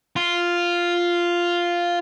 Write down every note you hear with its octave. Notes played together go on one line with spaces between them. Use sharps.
F4